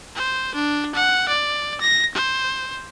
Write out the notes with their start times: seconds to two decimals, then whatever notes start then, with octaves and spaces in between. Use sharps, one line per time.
0.15 C5
0.55 D4
0.95 F#5
1.29 D5
1.81 A#6
2.15 C5